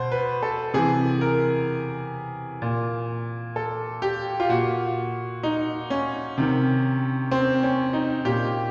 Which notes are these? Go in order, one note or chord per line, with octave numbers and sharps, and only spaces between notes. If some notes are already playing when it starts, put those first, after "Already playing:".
Already playing: B2 C5
B4
A4
C3 E3 G#4
A#4
A#2
A4
G4
F4
A#2 F#4
D#4
C#4
C3 D#3
C4
C#4
D#4
A#2 G4